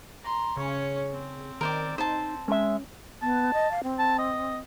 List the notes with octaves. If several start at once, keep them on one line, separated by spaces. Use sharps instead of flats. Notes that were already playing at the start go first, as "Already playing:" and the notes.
A#5 C6
C#3 C#4 C#5
C4
D#3 A#4 C5 D5
D#4 C5 A5
G#3 C#4 E5
B3 A5
D#5
F5
C4
A5
D#5